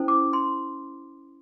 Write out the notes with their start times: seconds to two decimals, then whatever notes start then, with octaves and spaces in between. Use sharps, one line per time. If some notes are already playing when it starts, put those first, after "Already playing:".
Already playing: C#4 E4 A4 C5
0.08 D6
0.33 C6